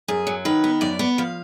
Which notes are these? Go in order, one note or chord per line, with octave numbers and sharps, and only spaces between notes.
F#2 G#4
F#3
D#3 B4
B3
F#2 D5
B3
F3 F5